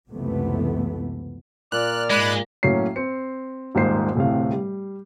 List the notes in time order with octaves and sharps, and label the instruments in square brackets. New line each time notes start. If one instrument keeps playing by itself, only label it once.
[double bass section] C#2 F#2 C3 E3 A3 B3
[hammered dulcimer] A#2 A#3 [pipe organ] D5 F6 [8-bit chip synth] F#6
[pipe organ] G#2 [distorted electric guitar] G#3 [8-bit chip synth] D5 B5 F#6
[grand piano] A2 F#3 A#3 C#4 C7
C4 C#7
D#1 G#2 A#3 C5 C7
D1 A2 C3 F5
G3